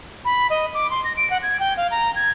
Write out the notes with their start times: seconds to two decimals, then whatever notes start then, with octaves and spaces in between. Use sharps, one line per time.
0.25 B5
0.50 D#5
0.74 D6
0.90 C6
1.04 A#6
1.17 D7
1.30 F#5
1.43 G#6
1.60 G5
1.77 F5
1.91 A#5
2.15 G#6